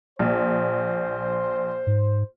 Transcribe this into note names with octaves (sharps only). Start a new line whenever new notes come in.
A#1 C5
G#2